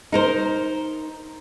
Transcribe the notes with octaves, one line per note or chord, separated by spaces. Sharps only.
D#4 A#4 C5